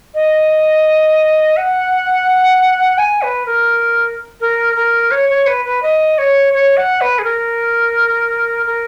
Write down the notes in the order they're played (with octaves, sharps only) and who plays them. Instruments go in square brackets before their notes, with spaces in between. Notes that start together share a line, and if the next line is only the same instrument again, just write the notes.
[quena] D#5
F#5
G#5
B4
A#4
A#4
A#4
C#5
C#5
B4
B4
D#5
C#5
C#5
F#5
B4
G#4
A#4
A#4